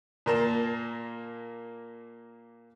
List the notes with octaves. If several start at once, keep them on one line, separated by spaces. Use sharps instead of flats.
A#2 A#3 A5